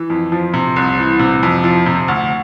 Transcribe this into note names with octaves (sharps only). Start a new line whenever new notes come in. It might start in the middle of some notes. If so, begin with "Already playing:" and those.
Already playing: E3
F2
F3
C3
C2
E3
C3
F2
F3
C3
D2